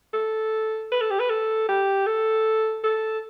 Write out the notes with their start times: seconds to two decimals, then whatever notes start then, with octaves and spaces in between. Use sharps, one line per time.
0.14 A4
0.92 B4
1.01 A4
1.10 G4
1.19 B4
1.30 A4
1.69 G4
2.06 A4
2.84 A4